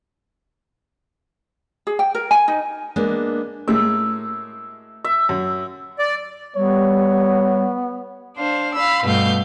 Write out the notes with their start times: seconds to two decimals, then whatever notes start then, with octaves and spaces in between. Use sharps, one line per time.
1.87 G#4
1.99 G5
2.15 A#4
2.31 G#5
2.48 D#4
2.96 G#3 A#3 B3 D4
3.68 A2 G#3 A#3 E5
5.04 E5
5.29 F#2
5.99 D5
6.56 G3 B3 C#5
8.37 D4 C5 F5
8.75 F5 B5 E6
9.04 G2 B2 A3 F5 G6